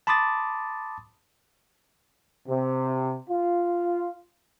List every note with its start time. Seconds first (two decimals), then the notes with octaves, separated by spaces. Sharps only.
0.07 A5 B5 C6 D6 D#6 A6
2.48 C3
3.30 F4